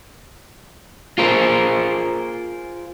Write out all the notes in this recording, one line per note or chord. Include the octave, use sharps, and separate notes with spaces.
F4 G#4 A#4 C5